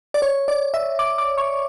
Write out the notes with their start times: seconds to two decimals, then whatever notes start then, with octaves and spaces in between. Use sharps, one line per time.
0.14 D5
0.22 C#5
0.48 D5
0.74 E5
0.99 D6
1.18 D6
1.38 C#6